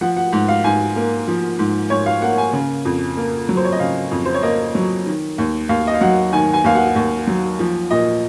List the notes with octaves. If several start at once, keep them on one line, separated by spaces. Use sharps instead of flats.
F3 F#5
F#5
G#2 F#5
F5
G#2 G#5
A#3
F3
G#2
G#2 C#5
F5
A#3 F#5
G#5
C#3
F2
A#3
F#3
C5
C#5
D#5
C#3 F5
F2
C5
C#5
A#3 D#5
F#3
D#3
D#2
D#2 F5
D#5
F5
F#3 F#5
D#3 G#5
G#5
D#2 F5
F#5
D#2
F#3
F3
A#2 D#5